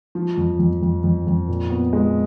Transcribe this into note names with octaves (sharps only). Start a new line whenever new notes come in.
F3
F2
F2
F2
F2
F2
A#2
B3
G#3